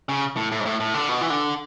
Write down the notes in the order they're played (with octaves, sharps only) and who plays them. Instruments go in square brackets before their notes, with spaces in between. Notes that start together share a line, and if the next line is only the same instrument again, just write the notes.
[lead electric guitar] C#3
A2
A2
G#2
A2
A2
D3
B2
E3
D3